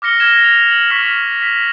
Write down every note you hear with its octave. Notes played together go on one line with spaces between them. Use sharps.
D6 F6 A#6 C#7 G7
F6 G#6 A#6 E7 G7
F7
F#7
C#6 F6 B6 F7
B6